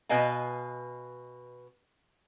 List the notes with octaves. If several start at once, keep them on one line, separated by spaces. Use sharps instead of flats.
B2 B4 D#5 F5 G#5